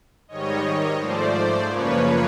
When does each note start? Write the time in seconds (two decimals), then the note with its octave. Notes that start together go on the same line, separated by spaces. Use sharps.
0.28 G#2 D#3 G3 C#5 D#5
0.99 G#2 F3 A3 C5 D5
1.69 F#2 C#3 F3 A#3 B4 C#5